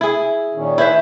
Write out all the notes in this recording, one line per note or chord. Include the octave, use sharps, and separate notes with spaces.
E4 G#4
A#2 D#3 C#4
E4 B4 C5 E5